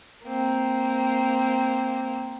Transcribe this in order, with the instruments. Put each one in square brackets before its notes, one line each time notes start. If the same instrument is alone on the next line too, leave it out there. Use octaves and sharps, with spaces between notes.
[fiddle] A#3 C4